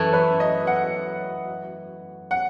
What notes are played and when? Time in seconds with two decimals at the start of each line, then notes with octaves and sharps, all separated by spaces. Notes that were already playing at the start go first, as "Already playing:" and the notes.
Already playing: F#2 E3 A3 A4
0.13 B4
0.40 D#5
0.67 F#5
2.31 F#5